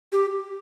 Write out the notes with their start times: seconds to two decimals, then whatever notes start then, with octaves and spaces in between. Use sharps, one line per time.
0.12 G4